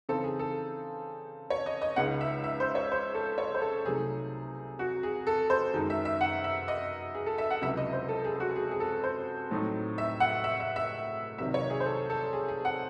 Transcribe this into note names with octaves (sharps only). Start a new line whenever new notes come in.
C#3 E3 C4 D#4 A4
G#4
A4
C#5
D#5
D#5
C#2 C#3 G#3 D#4 F#5
E5
E5
C5
C#5
C5
A4
C#5
C5
A4
C2 C3 F#3 A3 D#4 G#4
F#4
G#4
A4
C5
F#2 D#3 G#3 D#4
E5
E5
F#5
E5
D#5
G#4
A4
E5
F#5
C#2 C3 F#3 C#4 E4 E5
D#5
C5
A4
G#4
G#4
F#4
G#4
G#4
A4
C5
A2 F#3 A3 C4 D#4
E5
F#5
E5
E5
E5
C2 C3 D#3 F#3 E5
C#5
G#4
C5
A4
A4
G#4
G#4
F#5